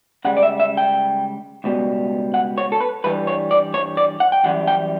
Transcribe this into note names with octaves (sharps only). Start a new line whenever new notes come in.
C#2 C#3 G3 F#5
D5
E5
E5
G5
C#2 B2 G3
F#5
C#5
A4
B4
G2 E3 G3 B4
C#5
D5
C#5
D5
F#5
G5
F#2 E3 G3 F#5
G5